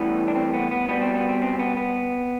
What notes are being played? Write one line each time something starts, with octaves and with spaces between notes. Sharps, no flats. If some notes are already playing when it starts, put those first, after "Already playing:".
Already playing: A2 E3 G3 B3
D4
C4
B3
B3
B2 G3 B3
C4
B3
C4
C4
B3
B3